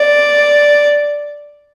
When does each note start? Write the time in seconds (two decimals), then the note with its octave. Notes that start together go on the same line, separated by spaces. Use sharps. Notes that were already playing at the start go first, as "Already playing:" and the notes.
Already playing: D5